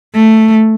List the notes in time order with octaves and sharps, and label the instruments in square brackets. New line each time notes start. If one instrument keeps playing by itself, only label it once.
[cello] A3